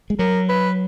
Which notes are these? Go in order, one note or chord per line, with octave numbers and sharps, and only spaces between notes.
G#3
F#3 A#4
B4